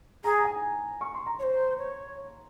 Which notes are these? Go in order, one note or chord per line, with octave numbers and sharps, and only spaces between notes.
G#4 A#5
A#5
G#5
C#6
C6
A#5
C#5
C5
C#5